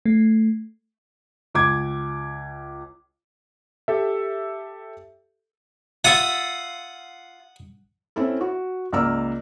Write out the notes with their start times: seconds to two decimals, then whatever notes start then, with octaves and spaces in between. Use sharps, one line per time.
0.06 A3
1.54 C#2 D6 G#6
3.88 G4 A4 E5
6.05 F4 E5 F#5 D#6
8.16 C4 C#4 E4 A4
8.41 F#4
8.93 C#2 A#3 D5 A#5 E6 F6